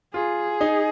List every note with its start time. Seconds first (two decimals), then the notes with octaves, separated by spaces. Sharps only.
0.14 F4 G#4
0.61 D#4